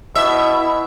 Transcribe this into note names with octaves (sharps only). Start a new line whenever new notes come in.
B2 E4 D#5 E5